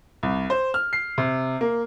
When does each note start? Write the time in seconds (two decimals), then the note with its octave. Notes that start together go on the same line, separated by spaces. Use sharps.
0.23 C2
0.50 C5
0.74 F6
0.93 C7
1.18 C3
1.61 A#3